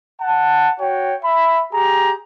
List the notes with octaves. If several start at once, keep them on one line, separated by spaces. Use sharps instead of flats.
F#5 A5
F#4 C#5 G5
E5 B5
G4 G#4 A#5